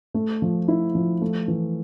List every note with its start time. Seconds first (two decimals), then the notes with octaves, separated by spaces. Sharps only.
0.14 A3
0.42 F3
0.68 E4
0.95 F3
1.22 A3
1.48 E3